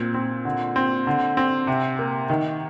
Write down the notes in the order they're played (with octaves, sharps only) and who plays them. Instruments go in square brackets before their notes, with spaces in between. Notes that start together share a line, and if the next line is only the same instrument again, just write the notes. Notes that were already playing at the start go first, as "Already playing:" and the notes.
Already playing: [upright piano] A#2 C4
C4
D3
C4
D3
C4
C3
A#3
D#3